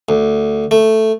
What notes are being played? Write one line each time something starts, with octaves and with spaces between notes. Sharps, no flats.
D2
A3